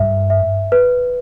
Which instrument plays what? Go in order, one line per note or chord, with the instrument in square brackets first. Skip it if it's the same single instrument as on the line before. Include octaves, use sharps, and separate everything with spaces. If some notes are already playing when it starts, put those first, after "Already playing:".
Already playing: [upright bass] G2 [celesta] E5
[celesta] E5
B4